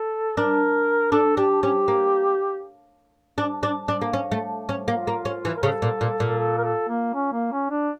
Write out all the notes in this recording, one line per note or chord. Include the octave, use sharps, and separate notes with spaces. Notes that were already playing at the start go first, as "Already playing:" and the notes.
Already playing: A4
D4 A#4
D4 A4
D4 G4
C#4 G4
A#3
D4
D4
D4
A#3
C#4
A3
C#4
A#3 F4
A#3
C#4
E3
A#4
C#3 A4
A#2
A#2
A#2
A4
A#4
A4
A#3
C#4
A#3
C#4
D4